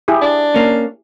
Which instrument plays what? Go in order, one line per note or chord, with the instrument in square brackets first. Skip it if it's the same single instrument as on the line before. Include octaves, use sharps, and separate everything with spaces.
[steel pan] E4 G4 G#4
[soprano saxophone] D4
[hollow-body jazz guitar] A#3 C#4